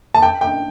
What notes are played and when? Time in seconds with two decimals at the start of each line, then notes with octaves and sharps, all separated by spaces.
0.14 A5
0.22 G5
0.41 G5